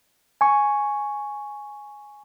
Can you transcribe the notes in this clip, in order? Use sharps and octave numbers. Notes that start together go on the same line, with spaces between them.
G#5 C#6